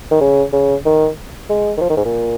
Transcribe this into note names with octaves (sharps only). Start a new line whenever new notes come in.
D#3
C#3
C#3
D#3
G#3
D#3
F3
D#3
G#2
A#2